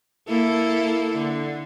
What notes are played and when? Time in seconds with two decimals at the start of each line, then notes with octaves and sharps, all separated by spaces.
0.29 A#3 E4 A4
1.17 D3